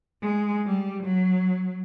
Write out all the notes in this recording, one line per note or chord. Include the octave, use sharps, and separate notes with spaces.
G#3
G3
F#3